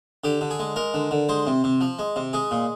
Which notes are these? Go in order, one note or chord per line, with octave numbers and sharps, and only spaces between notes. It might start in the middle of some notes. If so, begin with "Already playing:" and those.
D3 G4
D3
G#4
G#3
G#3 A#4
D3
D3
G#3 C5
C3
C3
F3
G#3
C3
G#3 G#4
A#2